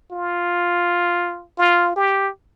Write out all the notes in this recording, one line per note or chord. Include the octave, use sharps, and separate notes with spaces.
F4
F4
G4